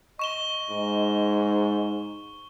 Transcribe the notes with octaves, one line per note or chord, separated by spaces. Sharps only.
D#5 C#6 E7 G7
G#2